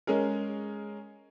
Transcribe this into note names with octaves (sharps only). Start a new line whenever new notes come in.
G#3 C#4 G#4 A#4